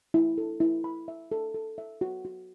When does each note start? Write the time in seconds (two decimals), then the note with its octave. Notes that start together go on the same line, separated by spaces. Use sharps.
0.14 E4
0.38 A4
0.60 E4
0.84 B5
1.08 E5
1.32 A4
1.54 A4
1.78 E5
2.01 F#4
2.25 F#4